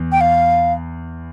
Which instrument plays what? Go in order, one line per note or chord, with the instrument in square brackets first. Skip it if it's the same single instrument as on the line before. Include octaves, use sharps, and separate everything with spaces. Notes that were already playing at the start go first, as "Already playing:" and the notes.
Already playing: [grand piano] E2
[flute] G5
F5